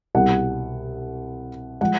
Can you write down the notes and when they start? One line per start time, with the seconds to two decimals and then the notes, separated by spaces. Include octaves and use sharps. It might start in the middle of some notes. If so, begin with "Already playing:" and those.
0.15 C2 B2 G3 F#5
1.81 F3 G#3 F#5